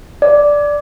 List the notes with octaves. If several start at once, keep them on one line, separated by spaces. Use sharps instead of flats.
D5